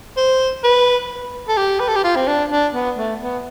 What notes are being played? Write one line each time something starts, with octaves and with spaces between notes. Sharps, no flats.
C5
B4
A4
G4
B4
A4
G4
F4
C4
D4
D4
B3
A3
B3